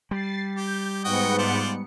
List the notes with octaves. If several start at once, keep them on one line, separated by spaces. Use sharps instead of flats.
G3 A6 C7
G4 G6
G#2 B3 F#4 D#5 G5 C#7
F4 C5 D5